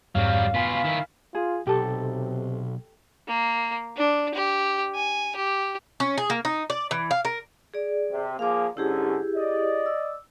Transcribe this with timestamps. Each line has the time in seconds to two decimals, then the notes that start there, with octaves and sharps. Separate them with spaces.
0.15 F2 G#2 F#3 G3 F5
0.54 B2 F4 G#5 B5 B6
0.84 D#3 E4
1.35 F4 G#4
1.67 B1 C3 G4 A4
3.28 A#3
3.97 D4
4.34 G4
4.95 G#5
5.36 G4
6.00 C#4
6.18 G#4
6.30 A#3
6.45 D#4
6.70 D5
6.91 E3
7.11 F5
7.25 A#4
7.74 G#4 D5
8.10 C3
8.39 F3 A#3 G#4 F5 D6
8.77 G#2 D3 C#4 E4 G4 G#4
9.37 D5 D#5
9.86 E6